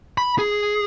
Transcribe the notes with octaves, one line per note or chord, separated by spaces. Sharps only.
B5
G#4